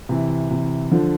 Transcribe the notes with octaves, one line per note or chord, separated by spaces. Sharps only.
C3 E3
C3 E3
D3 F3